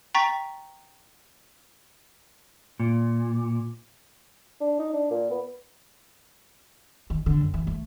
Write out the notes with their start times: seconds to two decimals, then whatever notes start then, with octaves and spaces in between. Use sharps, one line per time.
0.15 G5 A#5 C#6 A6 B6
2.80 A#2
4.60 D4
4.79 D#4
4.93 D4
5.11 A#2
5.30 B3
7.10 D#3
7.26 D3
7.41 F#2
7.54 E3
7.67 A3